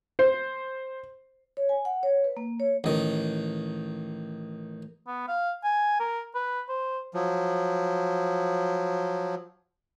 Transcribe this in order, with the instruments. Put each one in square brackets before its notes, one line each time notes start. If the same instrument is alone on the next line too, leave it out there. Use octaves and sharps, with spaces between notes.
[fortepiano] C5
[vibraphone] C#5
G#5
F#5
C#5
B4
A#3
C#5
[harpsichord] A1 D#3
[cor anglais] B3
F5
G#5
A#4
B4
C5
[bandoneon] F3 F#3